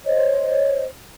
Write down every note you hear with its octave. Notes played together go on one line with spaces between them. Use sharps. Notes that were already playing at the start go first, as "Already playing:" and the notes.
C5 C#5 D#5